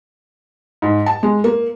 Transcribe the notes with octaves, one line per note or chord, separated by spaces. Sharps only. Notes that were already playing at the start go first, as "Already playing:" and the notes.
G#2
A5
G#3
A#3